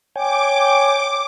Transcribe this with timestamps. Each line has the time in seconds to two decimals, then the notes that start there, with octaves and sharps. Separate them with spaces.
0.16 C#5 G5 G#5 D6